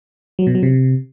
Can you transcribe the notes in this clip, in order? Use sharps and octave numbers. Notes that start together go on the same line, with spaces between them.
F#3
B2
F#3
C3